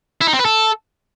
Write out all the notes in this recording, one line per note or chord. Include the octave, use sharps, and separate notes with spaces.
E4
D#4
C4
B4
A4